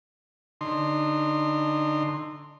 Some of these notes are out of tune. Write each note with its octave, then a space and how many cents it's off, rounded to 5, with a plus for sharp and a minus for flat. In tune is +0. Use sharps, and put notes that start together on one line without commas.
D3 -10 D#4 -25 C6 +0